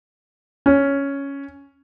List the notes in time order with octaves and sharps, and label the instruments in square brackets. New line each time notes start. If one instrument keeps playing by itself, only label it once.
[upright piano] C#4